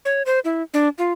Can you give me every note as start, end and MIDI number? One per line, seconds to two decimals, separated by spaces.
0.05 0.22 73
0.26 0.39 72
0.45 0.62 64
0.74 0.89 62
0.98 1.13 65